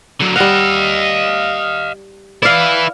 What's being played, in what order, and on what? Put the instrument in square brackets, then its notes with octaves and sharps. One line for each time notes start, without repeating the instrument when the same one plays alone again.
[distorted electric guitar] D3 F#3
[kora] G3 F#5 [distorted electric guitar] D#5 F5
[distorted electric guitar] E4 B4 [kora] D5 F5